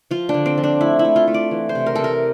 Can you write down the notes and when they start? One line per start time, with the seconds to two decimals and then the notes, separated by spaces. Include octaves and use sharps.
0.11 F3 F4
0.29 D4
0.34 D3
0.46 C4
0.58 F3
0.64 D4
0.81 A3 E4
0.99 E4
1.05 A3
1.16 F4
1.27 A3
1.34 D5
1.51 E3
1.69 C5
1.75 C3
1.86 A#4
1.95 C3 A4
2.04 A#4